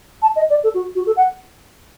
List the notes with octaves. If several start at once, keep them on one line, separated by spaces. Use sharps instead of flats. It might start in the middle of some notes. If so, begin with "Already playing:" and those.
A5
D#5
D5
A4
F#4
F#4
A4
F#5